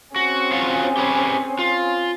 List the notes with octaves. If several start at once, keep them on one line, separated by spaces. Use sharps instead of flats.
C4 C#4 F#4 G#4
F4 F#4 C#5
G4 B4 C#5
F4